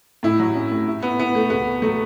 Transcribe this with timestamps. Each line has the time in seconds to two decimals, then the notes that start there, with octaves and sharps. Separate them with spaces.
0.23 A2 E4
0.39 F#3
0.55 C#4
0.72 A2
0.88 E4
1.03 B3 E4
1.19 B3 E4
1.35 B2 A3
1.50 C#2 B3
1.66 B2
1.82 F#3 A3